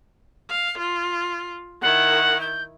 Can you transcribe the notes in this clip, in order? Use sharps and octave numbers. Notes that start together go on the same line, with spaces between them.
F5
F4
D#3 E4 F#5
G6